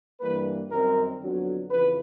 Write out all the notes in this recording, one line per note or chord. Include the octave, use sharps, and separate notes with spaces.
G2 E3 G3 A#3 B4
F#2 D#3 G3 C4 A#4
F2 D3 F#3 B3
F2 C#3 E3 B4